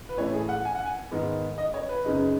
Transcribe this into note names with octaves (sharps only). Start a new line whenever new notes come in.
B4
A2 E3 A3 E4 C#5
G#4
F#5
G#5
F#5
G#5
G#2 D#3 G#3 B3
D#5
C#5
B4
F#2 C#3 G#3 D#4